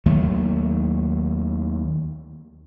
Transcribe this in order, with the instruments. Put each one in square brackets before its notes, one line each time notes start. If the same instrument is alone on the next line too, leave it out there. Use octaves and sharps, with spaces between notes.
[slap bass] D#2 D#3 F#3 A3